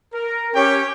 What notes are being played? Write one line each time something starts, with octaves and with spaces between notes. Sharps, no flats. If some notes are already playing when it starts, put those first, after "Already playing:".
A#4
C#4 G4 C#5 G5